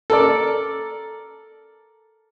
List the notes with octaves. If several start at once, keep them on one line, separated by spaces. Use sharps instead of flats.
A4 A#4 D5